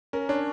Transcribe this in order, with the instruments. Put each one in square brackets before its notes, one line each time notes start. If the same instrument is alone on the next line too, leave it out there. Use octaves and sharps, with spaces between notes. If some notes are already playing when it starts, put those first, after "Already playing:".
[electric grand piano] C#4 [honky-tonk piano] A#4
[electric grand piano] D4 [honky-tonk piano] C#5